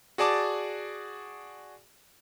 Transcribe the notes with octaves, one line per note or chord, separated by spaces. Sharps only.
F#4 G#4 D5 A5 D6